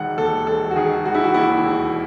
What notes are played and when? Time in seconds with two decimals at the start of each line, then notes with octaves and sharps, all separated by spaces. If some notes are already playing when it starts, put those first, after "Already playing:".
Already playing: E1 D#3 F#5
0.18 D#2 A4
0.47 E1 A4
0.71 F#4
0.76 D#3 G#4
1.05 E1 F#4
1.15 E4
1.24 F#4
1.34 D#2 E4
1.63 E1